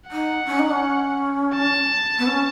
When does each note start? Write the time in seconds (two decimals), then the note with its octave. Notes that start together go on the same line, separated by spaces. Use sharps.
0.11 D#4 F#5
0.47 C#4
0.59 D#4
0.71 C#4
1.55 A5
2.18 B3
2.27 C#4